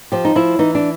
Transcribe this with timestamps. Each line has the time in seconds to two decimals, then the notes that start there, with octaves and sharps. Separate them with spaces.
0.12 F3 G4
0.25 D#4
0.35 F3 E4
0.59 E3 D#4
0.75 D4